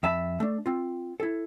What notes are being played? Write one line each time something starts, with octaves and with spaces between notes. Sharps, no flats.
F2 E5 A5 B5
A3 D4
C4 F4
E4 A4